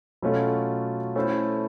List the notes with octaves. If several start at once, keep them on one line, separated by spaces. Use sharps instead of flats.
B2 F#3 A3 C#4 F4
A3 C#4 E4 A4 C5